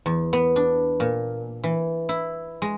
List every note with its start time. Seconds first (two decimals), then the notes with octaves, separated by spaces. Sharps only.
0.06 E2
0.33 B3
0.56 D4
1.00 A#2
1.64 E3
2.09 E4
2.62 G#3